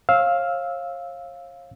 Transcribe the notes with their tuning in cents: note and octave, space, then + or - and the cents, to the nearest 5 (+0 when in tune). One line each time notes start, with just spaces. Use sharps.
C#5 -40 F5 +0 E6 -10